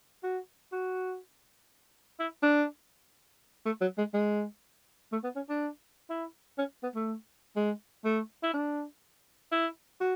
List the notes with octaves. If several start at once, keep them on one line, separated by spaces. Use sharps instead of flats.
F#4
F#4
E4
D4
A3
F#3
G#3
G#3
A3
B3
C#4
D4
E4
C#4
B3
A3
G#3
A3
E4
D4
E4
F#4